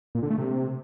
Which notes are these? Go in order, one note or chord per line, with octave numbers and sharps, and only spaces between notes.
A#2
D3
A3
C3